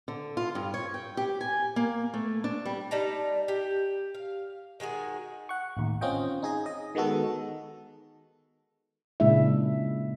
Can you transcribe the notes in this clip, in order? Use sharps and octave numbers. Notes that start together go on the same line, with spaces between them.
D3
F4
G2
C#5
G5
G4
G#5
A#3
A3
D4
G3
G3 D#4 A5 A#5
G4
F5
D#3 G#3 F#4 G#4
F#5 C#6
A1 D#2
C4 C#4 F4 D#5 G5
D#4 G#4 D#5
D#5
D#3 G#3 B3 F#4 A4
A#2 C#3 G#3 D4 E4 E5